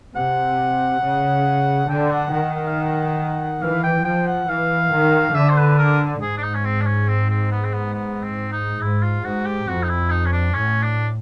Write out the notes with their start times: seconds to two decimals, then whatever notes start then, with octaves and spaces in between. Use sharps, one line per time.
0.15 C3 F#5
1.02 C#3
1.89 D3 G5
2.10 F#5
2.32 D#3 F#5
2.54 F#5
2.67 F5
2.81 F#5
3.62 E3 F5
3.83 G5
4.04 F3 G5
4.27 F#5
4.48 E3 F5
4.92 D#3
5.34 D3 E5
5.49 C5
5.56 B4
5.78 A#4
6.22 G#2 G#4
6.38 D4
6.43 D#4
6.55 C#4
6.65 C4
6.81 D4
6.87 C#4
7.08 C4
7.29 C4
7.51 B3
7.64 C4
7.73 B3
7.94 B3
8.23 C4
8.52 D#4
8.81 G#2 E4
9.02 F4
9.24 G#2 F#4
9.45 G4
9.68 F2 F#4
9.83 D#4
9.89 E4
10.10 D#4
10.26 C#4
10.32 D4
10.54 A2 C#4
10.83 D4